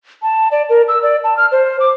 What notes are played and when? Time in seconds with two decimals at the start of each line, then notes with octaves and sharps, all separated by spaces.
0.22 A5
0.51 D5
0.70 A#4
0.88 E6
1.03 D5
1.24 A5
1.37 F6
1.52 C5
1.80 D6